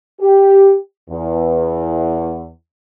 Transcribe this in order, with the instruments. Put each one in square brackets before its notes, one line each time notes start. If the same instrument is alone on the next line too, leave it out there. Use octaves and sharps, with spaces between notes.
[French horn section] G4
E2